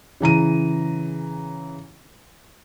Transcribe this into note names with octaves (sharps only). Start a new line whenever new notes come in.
C#3 E3 A#5 D#7